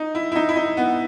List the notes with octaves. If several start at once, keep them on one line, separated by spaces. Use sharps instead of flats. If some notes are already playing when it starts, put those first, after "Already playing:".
Already playing: D#4
E4
E4
D#4
E4
D#4
B3